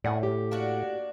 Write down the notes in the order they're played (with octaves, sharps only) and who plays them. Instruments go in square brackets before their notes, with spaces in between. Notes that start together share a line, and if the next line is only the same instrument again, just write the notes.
[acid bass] A2 [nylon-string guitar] D5 F#5 G#5
[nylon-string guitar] G4
[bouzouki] A#3 D4 F#4